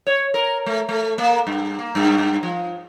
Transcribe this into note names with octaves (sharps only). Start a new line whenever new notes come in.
C#5
A#4
A3
A3
A#3
G2
A#3
G2
G2
F3